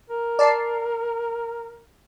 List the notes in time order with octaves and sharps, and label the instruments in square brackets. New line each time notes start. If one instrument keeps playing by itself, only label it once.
[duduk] A#4
[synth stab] D5 A5 C7